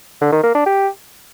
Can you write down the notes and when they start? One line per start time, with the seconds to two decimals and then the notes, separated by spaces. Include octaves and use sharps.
0.21 D3
0.33 D#3
0.44 A#3
0.55 D4
0.66 G4